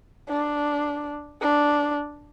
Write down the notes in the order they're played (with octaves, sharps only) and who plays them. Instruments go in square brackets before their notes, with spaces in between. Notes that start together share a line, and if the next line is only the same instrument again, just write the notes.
[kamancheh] D4
D4